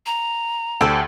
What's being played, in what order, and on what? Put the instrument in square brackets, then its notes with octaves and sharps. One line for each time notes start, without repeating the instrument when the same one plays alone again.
[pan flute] A#5
[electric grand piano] D2 [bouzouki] G4 A4 C5